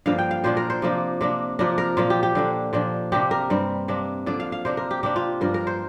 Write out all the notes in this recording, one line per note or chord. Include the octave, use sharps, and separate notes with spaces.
G2 D3 F3 A#3 F5
G5
F5
A#2 F3 D4 C5
A#4
C5
C3 F3 A#3 D4
C3 A#3 D4
C3 F3 D4 A#4
A#4
A#2 F3 A#3 F4
G4
G4
D3 A#3 D4
A#2 F3 A#3 D4
C3 A#3 D4 G4
A#4
G2 G3 C4
C3 A#3 D4
D3 F3 D4 D5
F5
F5
C3 A#3 D4 C5
A#4
G4
C3 A#3 D4 G4
F4
G2 F3 A#3 D4 A#4
A#4
C5